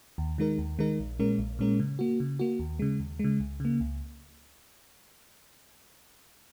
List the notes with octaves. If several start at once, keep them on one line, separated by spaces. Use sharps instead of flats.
D#2
D#3 G#3 D#4 A#4
D#2
D#3 G#3 D#4 A#4
A#1
A#2 G#3 C#4 A#4
A#1
A#2 G#3 C#4 A#4
C#3
A#3 F#4
C#3
A#3 F#4
D#2
C#3 G#3
D#2
C#3 G#3
C#2
C#3 A#3
C#2